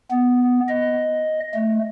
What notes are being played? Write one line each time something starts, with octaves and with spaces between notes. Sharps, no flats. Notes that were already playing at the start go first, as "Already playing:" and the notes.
B3
D#5
A3